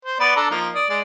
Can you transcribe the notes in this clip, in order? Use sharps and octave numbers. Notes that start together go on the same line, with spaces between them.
C5
B3 B4 D5
D4 A4 A#5
F3 A#3 D#4
D5 D#6
G#3 D5